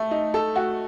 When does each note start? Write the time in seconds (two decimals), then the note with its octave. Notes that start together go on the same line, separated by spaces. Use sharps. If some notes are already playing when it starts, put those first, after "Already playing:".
Already playing: A3 A4
0.11 D#4
0.34 A4
0.56 F#4